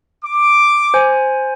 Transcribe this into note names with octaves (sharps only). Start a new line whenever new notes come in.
D6
C5 G#5